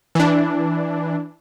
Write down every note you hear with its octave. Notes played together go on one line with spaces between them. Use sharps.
E3 D4